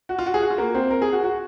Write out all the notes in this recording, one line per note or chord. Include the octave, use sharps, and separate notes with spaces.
F#4
F4
F#4
G#4
F#4
F4
A#3
C4
A#4
G#4
F#4
F#4